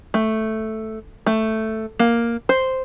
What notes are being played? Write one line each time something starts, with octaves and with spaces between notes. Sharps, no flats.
A3
A3
A#3
C5